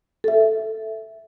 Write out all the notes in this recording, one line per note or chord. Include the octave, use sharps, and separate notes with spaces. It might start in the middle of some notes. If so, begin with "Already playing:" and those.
A4 E5